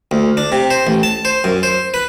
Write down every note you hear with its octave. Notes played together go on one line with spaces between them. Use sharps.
D2
D4
C3
C5
A1
A5
C5
F#2
C5
B4